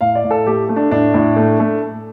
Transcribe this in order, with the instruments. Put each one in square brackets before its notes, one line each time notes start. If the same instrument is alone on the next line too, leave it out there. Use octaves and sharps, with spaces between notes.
[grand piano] A2 F5
D5
A2
A4
A3 G4
A3
D4
A2 D4
A2
A3
A3